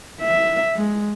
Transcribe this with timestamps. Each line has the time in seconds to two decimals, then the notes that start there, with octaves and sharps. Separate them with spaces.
0.21 E5
0.77 G#3